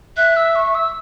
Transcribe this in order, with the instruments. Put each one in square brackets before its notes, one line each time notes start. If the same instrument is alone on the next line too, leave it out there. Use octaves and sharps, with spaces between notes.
[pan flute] E5 [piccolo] F#6
[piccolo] E6
C#6
E6